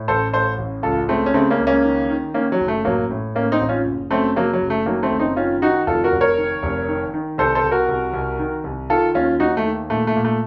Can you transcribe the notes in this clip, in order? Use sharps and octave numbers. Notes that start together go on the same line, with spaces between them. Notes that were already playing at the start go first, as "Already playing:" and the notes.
Already playing: A2
A1 A4 C5
A2 A4 C5
A1
C#2 F4 A4
C#3 A3 C4
C#4
C#3 A3 C4
A#3 C#4
C#2
A#3 C#4
D#3
D#3
D#3 A#3 C#4
F#3
F#1
A3
A1 F#3 A#3
A2
A2 A#3 C#4
C4 D#4
A1
C#4 F4
F#1
F#2 A3 C4
C#3 F#3 A#3
F#3
F#1
A3
D#3 F#3 A#3
A3 C4
F#1
C4 D#4
D#3 C#4 F4
D#3 D#4 F#4
F1 F4 A4
F#4 A#4
F1
A#4 C#5
D#3
F1
D#3
D#3
C2 A4 C5
A4 C5
C2
F#4 A#4
C2
C2
D#3
C2
D#3 F4 A4
D#2 C#4 F4
D#2 D#4 F#4
A3
D#3
A#2 A3
A3
A#2
A3